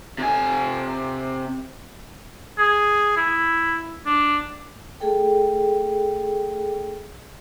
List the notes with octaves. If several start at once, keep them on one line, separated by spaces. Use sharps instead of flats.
C3 G#5
G#4
E4
D4
A3 G#4 A4 G5